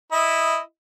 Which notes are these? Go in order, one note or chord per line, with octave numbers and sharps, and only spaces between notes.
E4 D#5